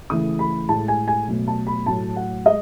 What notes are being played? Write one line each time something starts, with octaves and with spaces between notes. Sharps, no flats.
C#3 E3 A3 D#6
B5
A2 G#3 A5
G#5
G#5
B2 F#3 A3
A5
B5
A2 F#3 A3 A5
F#5
G#3 D#5